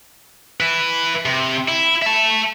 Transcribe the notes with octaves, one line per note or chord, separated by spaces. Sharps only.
E4 B4
C3
E4
E5 A5